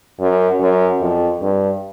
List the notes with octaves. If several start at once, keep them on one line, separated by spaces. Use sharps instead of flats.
F#2
F#2
F2
G2